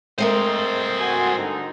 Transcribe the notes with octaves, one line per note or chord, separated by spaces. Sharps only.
G#3 A3 C4 A#4 C5 D#5
F#4 G#5
D3 G3 D#4